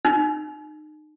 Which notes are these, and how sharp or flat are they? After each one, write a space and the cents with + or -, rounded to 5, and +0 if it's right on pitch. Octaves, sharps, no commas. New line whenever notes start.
D#4 -30